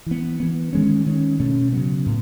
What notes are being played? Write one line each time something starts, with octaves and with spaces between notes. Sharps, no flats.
E3 B3
E3 B3
D#3 G#3 C#4
D#3 G#3 C#4
B2 A3 C#4
C#3 F#3 B3
A2